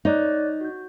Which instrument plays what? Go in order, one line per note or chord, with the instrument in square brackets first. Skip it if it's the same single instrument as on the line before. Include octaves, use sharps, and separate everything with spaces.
[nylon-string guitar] D#4 [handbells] C#5 D5 F#6
[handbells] F#4 G6